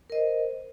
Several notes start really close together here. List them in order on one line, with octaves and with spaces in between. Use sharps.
A#4 D#5 C5